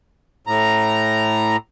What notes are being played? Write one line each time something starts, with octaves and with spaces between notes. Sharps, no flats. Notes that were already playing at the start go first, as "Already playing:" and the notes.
A2 A#5